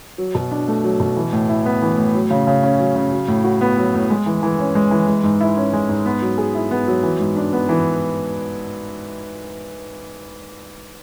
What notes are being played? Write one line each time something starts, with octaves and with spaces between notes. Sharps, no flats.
F#3
B2
D4
A3
F#3
B2
E3
A2
E4
B3
E3
A2
F#3
C#3
C#3
C#4
F#3
C#3
F#3
A2
F#4
B3
F#3
A2
G#3
E3
E3
C#4
G#3
E3
G#3
G#2
E4
C#4
G#3
G#2
B3
F#3
G#4
E4
B3
F#3
E3
G#2
D4
B3
E3